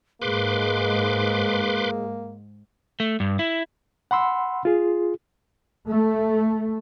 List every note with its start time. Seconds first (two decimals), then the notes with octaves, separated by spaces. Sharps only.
0.22 G#2 G#3 A#3 G#4 B4 C6 D6
3.00 A3
3.20 G2
3.39 E4
4.11 F#5 B5 C6 E6
4.65 F4 G#4
5.88 A3